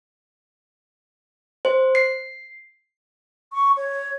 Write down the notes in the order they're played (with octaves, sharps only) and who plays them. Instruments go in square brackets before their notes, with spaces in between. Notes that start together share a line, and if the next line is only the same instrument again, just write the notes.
[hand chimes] C5
C7
[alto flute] C#6
C#5